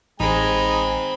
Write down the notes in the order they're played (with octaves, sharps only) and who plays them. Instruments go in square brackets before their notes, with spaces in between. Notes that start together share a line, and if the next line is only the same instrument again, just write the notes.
[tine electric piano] A1 [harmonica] G#3 G#5 [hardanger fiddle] C4 B5 [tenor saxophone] D#4